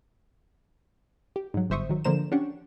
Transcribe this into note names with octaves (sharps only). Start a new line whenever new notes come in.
G4
G#2 F#3
G1 G#2 C5 E5 C#6 D#6
D#3 F#3
D3 F3 A#3 C5 A#5 E7
C#4 D4 G4 F#5 G5 C#6